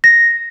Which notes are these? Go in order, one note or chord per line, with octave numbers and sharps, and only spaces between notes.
A#6